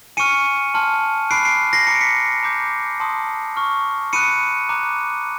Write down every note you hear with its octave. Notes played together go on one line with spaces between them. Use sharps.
G#5 C#6 F6 C#7 D#7
A5 C6 F6
B5 D6 F#6 C7 D7
C7 D7
A#6 C7
A#5 D6 F#6 C#7
D7
B6 C#7
A#5 D6 G6
A5 C6 D#6
C#6 F6
B5 D#6 F#6 C#7 D#7
A#5 D6 F#6